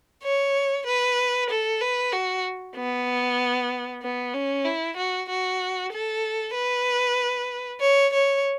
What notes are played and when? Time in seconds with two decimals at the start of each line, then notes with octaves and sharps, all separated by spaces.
0.24 C#5
0.87 B4
1.50 A4
1.81 B4
2.13 F#4
2.76 B3
4.03 B3
4.34 C#4
4.65 E4
4.97 F#4
5.29 F#4
5.92 A4
6.54 B4
7.81 C#5
8.13 C#5